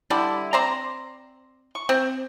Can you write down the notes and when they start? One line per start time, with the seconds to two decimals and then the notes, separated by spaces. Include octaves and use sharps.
0.10 D3 G3 D4 E4
0.53 C4 C5 D5 A#5
1.75 C#6
1.89 C4